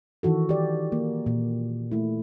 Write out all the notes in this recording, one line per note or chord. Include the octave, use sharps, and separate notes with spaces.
D#3 E3 F#4 A4
G4 D5
A#3
A#2
A3 E4